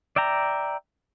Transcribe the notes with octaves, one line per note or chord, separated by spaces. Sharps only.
D5 E5 G5 A#5